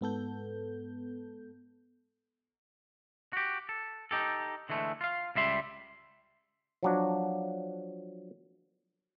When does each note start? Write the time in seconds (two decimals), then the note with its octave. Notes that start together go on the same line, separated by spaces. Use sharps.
0.01 G#2 B3 A4 G6
3.33 F#4 G4
3.69 A4
4.11 D#4 G4 A4
4.69 D3 E3 G#3 A3
5.01 F4 F5
5.35 C#2 G3 E5 C6
6.83 F3 F#3 D4